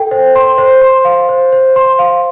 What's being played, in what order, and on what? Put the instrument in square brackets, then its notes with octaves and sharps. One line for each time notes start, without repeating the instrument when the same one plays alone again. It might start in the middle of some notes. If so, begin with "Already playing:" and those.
Already playing: [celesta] A4 G5
C5
C6
C5
C6
F5
C5
C5
C6
F5